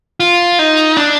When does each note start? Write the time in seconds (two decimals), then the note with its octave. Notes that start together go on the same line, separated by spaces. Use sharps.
0.20 F4
0.59 D#4
0.97 D4